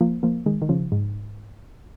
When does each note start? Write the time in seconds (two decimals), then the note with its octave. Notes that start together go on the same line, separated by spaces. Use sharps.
0.01 F3 A#3
0.23 F3 A#3
0.46 D#3 G#3
0.62 D#3
0.69 C#3 F3
0.92 G#2